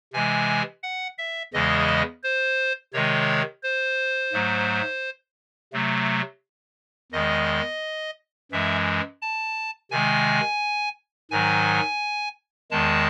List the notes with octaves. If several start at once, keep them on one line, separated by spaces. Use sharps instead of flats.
C3 E3 G#3 G#5
F#5
E5
E2 C#3 E3 G#3 D#5
C5
C3 D#3 G#3 C#5
C5
G#2 F#3 A3
C3 F#3 A3
E2 D#3 G#3 D#5
F#2 E3 G#3 E5
A5
C3 D#3 G#3 G#5
G#2 D#3 F#3 G#5
E2 D#3 G#3 A5